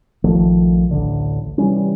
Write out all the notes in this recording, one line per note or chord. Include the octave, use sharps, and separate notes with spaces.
A#1 D#3 F3 A3
A1 D2 D3
C3 E3 G3 C#4